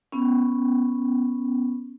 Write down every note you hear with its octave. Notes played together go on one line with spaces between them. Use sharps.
B3 C#4